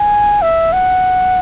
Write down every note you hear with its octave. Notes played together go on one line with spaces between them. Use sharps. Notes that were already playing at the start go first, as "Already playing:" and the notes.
Already playing: G#5
E5
F#5